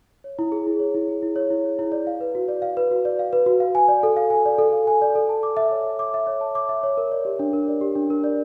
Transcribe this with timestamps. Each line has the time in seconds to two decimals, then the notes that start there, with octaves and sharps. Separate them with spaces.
0.24 C#5
0.39 E4
0.52 G#4
0.67 E4
0.80 C#5
0.94 E4
1.09 G#4
1.22 E4
1.36 C#5
1.50 E4
1.65 G#4
1.79 E4
1.92 D5
2.07 F5
2.21 B4
2.35 F#4
2.48 D5
2.62 F5
2.77 B4
2.91 F#4
3.05 D5
3.19 F5
3.33 B4
3.46 F#4
3.60 F5
3.75 G#5
3.88 D5
4.03 A4
4.16 F5
4.30 G#5
4.46 D5
4.58 A4
4.73 F5
4.87 G#5
5.02 D5
5.15 A4
5.29 A5
5.43 D6
5.57 E5
5.71 C#5
5.86 A5
5.99 D6
6.14 E5
6.27 C#5
6.41 A5
6.55 D6
6.69 E5
6.83 C#5
6.97 A#4
7.12 D5
7.25 G4
7.39 D4
7.53 A#4
7.68 D5
7.81 G4
7.95 D4
8.10 A#4
8.24 D5